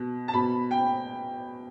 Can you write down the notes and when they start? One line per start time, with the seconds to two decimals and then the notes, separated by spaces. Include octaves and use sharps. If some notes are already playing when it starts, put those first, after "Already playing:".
Already playing: B2
0.28 A5
0.33 B2 B5
0.71 G5